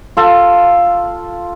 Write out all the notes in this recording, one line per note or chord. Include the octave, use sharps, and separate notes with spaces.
F4 A4